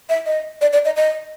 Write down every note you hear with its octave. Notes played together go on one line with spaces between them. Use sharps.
E5
D#5
D5
D5
D#5
D#5